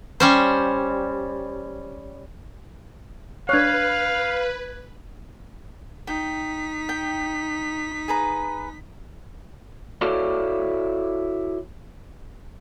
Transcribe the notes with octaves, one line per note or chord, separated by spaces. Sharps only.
G3 C#4 C5
D4 B4 C#5 F5 F#6 G#6
D#4 G5 B6
G5
G#4 B4 A#5
E4 F#4 A4 C#5 D5 F5